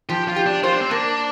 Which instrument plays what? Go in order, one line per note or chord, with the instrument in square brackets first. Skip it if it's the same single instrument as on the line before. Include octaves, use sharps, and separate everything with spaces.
[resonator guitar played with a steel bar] F3 [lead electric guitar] G4
[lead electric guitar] F4
[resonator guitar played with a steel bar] G4
[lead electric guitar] D4
[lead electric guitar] F4 [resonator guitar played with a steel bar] C5
[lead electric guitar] D4
C4
[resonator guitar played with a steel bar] A#3 [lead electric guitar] D4